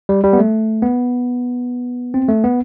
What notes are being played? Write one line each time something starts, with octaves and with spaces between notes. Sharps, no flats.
G3
G3
B3
A3
B3
C4
A3
B3